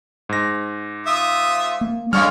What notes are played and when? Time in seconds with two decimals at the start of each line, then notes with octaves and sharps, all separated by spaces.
0.29 G#2 A#6
1.07 F4 E5 D#6
1.81 A#3
2.13 D3 G3 G#3 C#4 F5 C#6 F6